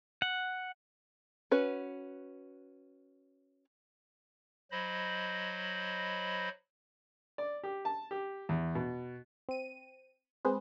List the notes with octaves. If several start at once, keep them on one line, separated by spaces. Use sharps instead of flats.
F#5
C#4 F#4 B4
F#3 C5 D#5 B5
D5
G4
A5
G4
E2
B2
C4 D#7
G#3 C4 G#4 B4 C5